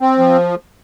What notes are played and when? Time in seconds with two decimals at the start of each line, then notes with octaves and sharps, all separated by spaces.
0.01 C4
0.19 F3